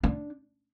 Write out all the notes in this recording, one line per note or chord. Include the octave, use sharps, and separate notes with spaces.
D4